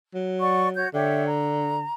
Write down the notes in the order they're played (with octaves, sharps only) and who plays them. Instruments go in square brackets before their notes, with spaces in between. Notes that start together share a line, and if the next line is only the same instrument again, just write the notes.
[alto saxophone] F#3
[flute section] D5 F#5 C#6
F#4 C#5 G6
[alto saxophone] D3 [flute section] G4 C#5 E5
[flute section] A#5